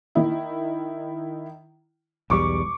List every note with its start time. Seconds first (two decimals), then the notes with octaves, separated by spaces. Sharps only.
0.15 D#3 E4
2.30 B1 E2 G3 C#6 D6